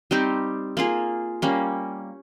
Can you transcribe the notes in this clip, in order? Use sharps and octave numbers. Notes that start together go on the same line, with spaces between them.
G3 C4 D#4 G4
A#3 F4 G#4
G3 A#3 C#4